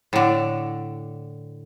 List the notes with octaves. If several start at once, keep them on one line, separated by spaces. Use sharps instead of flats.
A2 D3